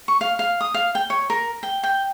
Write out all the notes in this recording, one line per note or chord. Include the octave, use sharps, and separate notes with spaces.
C#6
F5
F5
D#6
F5
G5
C#5
A#4
G5
G5